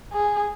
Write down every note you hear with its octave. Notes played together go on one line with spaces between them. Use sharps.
G#4